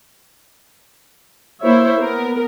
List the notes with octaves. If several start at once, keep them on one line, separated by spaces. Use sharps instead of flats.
A#3 E4 C5 C#5 E5
B3 A#4